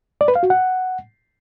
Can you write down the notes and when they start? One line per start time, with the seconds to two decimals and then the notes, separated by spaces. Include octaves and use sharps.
0.21 D5
0.28 B4
0.35 F5
0.43 F#4
0.50 F#5